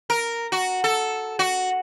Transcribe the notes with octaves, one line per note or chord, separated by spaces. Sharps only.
A#4
F#4
A4
F#4